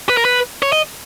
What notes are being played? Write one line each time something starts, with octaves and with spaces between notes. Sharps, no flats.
B4
A#4
B4
C#5
D#5